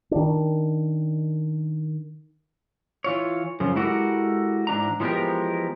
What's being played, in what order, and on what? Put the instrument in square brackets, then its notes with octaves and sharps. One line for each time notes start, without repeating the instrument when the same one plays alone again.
[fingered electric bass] D#3 D4
[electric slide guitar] E3 F4 C#5
F#2 C#3 F3
G#3 E4 F#4 G4 A4 A#4
G#2 E3 D4 A#5
E3 F3 G#3 B3 G4 A#4